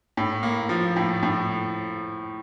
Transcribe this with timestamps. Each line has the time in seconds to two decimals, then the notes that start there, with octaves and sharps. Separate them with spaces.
0.17 A2
0.43 A#3
0.69 F3
0.96 A2
1.23 A2